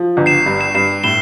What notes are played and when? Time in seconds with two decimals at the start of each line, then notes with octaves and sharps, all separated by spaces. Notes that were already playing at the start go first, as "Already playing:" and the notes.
Already playing: F3
0.17 G1
0.26 C7 E7
0.46 G2
0.60 C7 E7
0.75 G2 C7 E7
1.04 A2 E7 G7